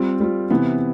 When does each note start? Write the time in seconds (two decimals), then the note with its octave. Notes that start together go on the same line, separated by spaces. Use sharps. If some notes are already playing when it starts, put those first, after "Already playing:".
Already playing: G3 C4 F4
0.20 G3 C4 F4
0.50 C3 E3 B3